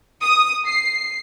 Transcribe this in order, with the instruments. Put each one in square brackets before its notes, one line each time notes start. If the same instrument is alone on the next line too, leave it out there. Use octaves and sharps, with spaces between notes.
[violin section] D#6
C7